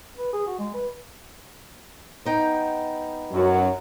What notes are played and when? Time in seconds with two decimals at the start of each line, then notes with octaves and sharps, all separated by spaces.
0.17 B4
0.33 G#4
0.46 F#4
0.59 G#3
0.74 B4
2.25 B3 D#4 G5
3.32 F#2 F#3